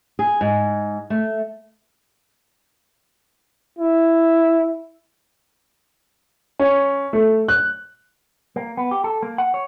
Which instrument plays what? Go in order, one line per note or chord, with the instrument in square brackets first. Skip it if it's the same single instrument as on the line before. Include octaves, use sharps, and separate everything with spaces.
[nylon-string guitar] G#4
G#2
A3
[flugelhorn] E4
[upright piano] C#4
A3
F#6
[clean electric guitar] A#3
B3
G4
A4
A#3
F#5
C#5